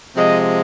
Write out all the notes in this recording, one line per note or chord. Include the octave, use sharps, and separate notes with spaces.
C3 F3 G#3 D#5